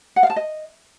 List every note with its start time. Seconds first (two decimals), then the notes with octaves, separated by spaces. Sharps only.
0.16 F#5
0.23 F5
0.30 A5
0.36 D#5